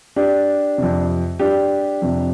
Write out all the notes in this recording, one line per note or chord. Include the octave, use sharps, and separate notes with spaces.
D4 G4
F2 C3
D4 G4
F2 C3